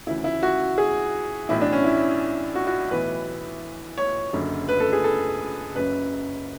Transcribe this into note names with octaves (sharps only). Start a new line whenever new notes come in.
D2 C#3 E3 E4
E4
F#4
G#4
B1 A2 E3 E4
D4
C#4
E4
F#4
F#4
B1 A2 E3 B4
C#5
F#1 F#2 D3
B4
A4
G#4
A4
F#1 F#2 C#3 B4